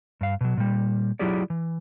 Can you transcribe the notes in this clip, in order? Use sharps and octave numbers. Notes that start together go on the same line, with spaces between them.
G2 F5
B2 F#3
A#2 G3
F#3 E4 F4 G4 G#4 D5
E3